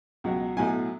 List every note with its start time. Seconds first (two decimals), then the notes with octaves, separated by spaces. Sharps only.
0.24 C#2 B2 F#3
0.57 B1 A2 F#3 G#5